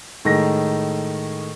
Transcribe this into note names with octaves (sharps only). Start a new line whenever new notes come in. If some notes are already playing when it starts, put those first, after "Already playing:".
A2 D#3 G#3 G#4 A#6